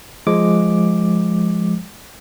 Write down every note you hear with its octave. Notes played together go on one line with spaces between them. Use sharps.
F3 G#3 D6